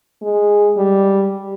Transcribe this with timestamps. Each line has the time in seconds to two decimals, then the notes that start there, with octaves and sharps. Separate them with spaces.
0.22 G#3
0.77 G3